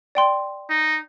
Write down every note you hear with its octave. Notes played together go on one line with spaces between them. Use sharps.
D5 G5 C6
D#4